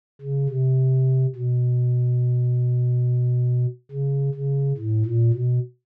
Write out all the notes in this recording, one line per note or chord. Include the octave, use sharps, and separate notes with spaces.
C#3
C3
B2
C#3
C#3
A2
A#2
B2